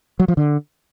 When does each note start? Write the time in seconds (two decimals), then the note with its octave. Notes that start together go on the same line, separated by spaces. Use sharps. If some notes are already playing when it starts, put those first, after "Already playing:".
0.20 F#3
0.28 F3
0.37 D3